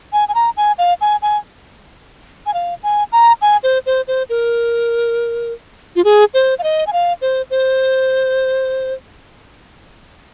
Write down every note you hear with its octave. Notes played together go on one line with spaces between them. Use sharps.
G#5
G#5
A#5
G#5
F5
G#5
G#5
G#5
F5
G#5
A#5
G#5
C5
C5
C5
A#4
F4
G#4
C5
F5
D#5
G#5
F5
C5
C5